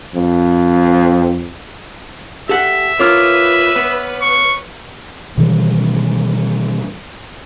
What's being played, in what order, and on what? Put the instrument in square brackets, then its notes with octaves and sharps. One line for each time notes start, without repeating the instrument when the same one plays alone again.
[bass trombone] F2
[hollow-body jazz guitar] G4 A4 F#5 [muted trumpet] E5
[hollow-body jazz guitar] E4 F4 A#4 [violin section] B4 [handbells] C#5 D6 F6
[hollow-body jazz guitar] B3
[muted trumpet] C#6
[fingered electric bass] B2 D#3 E3 G3